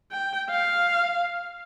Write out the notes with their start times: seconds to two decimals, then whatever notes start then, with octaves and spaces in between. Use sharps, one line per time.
0.12 G5
0.50 F5